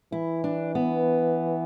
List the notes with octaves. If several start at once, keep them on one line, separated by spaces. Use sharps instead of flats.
E3 E4
D4
B3